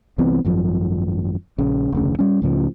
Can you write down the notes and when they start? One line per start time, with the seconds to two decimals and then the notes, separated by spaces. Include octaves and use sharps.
0.18 C2 E3 B3 C4
0.45 G#1 F#2 F3
1.59 A#1 C#3
1.92 F1 D2 C#3
2.19 G3 C#4
2.42 C#2 A2 C#3 F3